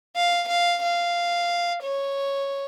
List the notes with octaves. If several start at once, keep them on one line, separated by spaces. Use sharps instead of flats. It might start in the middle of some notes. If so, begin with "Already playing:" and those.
F5
F5
F5
C#5